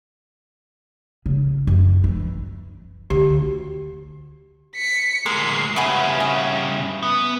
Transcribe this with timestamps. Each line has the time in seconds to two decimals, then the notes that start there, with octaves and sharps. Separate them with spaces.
1.26 C#3
1.67 F#2
2.04 E3
3.10 D2 G4
4.76 B6 C#7
5.26 D2 G#3 A#4 C7
5.76 G2 C#3 B4 E5 F#5 G#5
6.20 G#5
7.03 B3